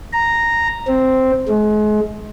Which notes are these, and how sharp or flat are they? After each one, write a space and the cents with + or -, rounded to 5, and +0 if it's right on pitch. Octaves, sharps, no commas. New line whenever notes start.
A#5 -5
C4 -5
G#3 +35